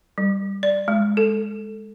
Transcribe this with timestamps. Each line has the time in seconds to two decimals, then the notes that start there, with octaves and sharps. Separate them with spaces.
0.18 G3
0.63 D5
0.88 G#3
1.17 A4